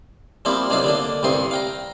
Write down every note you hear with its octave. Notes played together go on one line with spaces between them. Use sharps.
F3 G3 A#3 C4 E4
C2 F#3 D4 D#4 F5
D3 A#3 D4
C2 G2 C4 C6 D#6
F5 G5 A#5